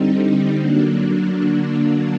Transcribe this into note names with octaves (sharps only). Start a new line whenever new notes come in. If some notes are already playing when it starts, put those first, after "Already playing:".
Already playing: D3 G3 C4 D#4
D3 F#3 A#3 D4